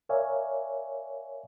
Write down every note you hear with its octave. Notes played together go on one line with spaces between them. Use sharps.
A#4 C#5 D5 E5 F5 G#5